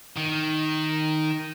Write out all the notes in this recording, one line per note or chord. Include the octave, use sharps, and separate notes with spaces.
D#3